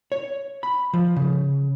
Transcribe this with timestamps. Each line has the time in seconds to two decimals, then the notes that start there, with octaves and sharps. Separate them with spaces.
0.12 C#5
0.63 B5
0.94 F3
1.16 C#3